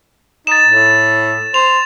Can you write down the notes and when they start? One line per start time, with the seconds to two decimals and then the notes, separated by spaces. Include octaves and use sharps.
0.47 D#4 A6 E7
0.67 A2
1.54 C5 F7